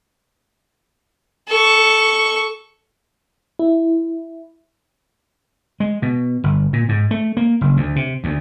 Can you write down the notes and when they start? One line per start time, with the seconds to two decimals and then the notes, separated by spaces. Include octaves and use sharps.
1.49 A4 C#6
3.59 E4
5.80 G#3
6.02 B2
6.44 G1
6.73 A#2
6.89 G#2
7.11 A3
7.37 A#3
7.61 F#1
7.77 D2
7.96 C3
8.24 D2